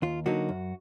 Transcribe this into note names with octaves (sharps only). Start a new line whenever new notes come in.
D#2 F4
D3 F#3 A#3 D#4 F#4
F#2